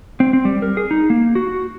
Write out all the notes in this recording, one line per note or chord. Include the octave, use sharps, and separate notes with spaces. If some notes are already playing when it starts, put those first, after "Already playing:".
C4
C4
G3
A#4
G#4
D#4
A#3
F#4